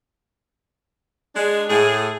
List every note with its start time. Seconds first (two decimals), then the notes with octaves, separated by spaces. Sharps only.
1.36 G#3 D4
1.69 A2 G#4